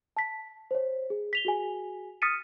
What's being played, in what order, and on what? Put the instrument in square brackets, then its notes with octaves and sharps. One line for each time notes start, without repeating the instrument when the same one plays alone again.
[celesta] A5 B6
C5 C#5
G#4
B6 F7 G7
F#4 G#4 G#5
D#6 F6 A6 B6 C#7 D#7